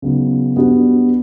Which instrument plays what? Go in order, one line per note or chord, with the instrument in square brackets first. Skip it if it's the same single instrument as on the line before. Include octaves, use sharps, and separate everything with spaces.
[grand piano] C#3 F#3 B3 D#4
G3 B3 D4 F#4